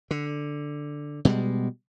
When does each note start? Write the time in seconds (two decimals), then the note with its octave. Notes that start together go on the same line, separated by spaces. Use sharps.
0.11 D3
1.25 B2 G3 G#3